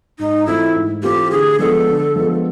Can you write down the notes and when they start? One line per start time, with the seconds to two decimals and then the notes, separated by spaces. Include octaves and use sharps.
0.19 G#2 D#4
0.46 E3 A3 C4 E4 F4
0.75 G#2
1.03 E3 A3 C4 F4 G4
1.31 D3 G#4
1.59 F3 G#3 B3 D4 A4
1.88 D3
2.16 F3 G#3 B3 D4